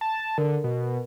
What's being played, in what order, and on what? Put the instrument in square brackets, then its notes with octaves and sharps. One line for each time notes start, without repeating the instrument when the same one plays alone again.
[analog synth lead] A5
[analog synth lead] D3 [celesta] A#4
[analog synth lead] B2